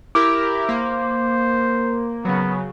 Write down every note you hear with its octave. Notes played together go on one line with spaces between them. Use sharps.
E4 G4 A#4 D6
A#3 C5
C#3 F#3 B3